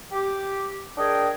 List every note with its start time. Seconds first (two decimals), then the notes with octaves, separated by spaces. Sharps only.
0.12 G4
0.98 D4 G#4 A#4 D#5 G5